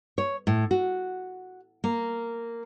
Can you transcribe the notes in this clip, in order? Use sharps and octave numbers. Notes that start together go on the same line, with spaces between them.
C#5
A2
F#4
A#3